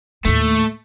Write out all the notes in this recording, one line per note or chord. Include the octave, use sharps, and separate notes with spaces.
D#2 A2 A3